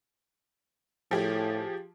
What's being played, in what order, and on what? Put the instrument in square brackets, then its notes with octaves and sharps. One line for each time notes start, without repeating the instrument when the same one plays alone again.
[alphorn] A2 [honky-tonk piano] F3 G4 G#4